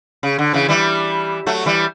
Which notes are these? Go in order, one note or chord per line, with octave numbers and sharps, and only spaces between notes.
C#3
D3
C#3 E3
E3 G3
F#3 A3
E3 G3